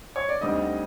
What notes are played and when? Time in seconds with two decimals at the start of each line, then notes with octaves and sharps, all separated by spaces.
0.16 C#5
0.29 D5
0.41 D2 D3 G3 C4 D#4 D#5